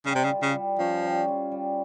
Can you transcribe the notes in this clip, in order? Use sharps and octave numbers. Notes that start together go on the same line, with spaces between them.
C#3 G3
C3
C#3
F4
C#3
G3
F3 C#4
G3
F4
G3